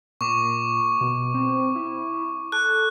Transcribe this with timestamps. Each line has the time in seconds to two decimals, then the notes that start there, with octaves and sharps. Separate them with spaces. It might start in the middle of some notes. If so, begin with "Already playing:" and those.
0.21 A#2 C#6 D6
1.01 B2
1.34 C4
1.76 E4
2.52 A4 F#6